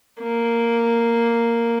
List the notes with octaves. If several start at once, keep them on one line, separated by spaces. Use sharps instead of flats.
A#3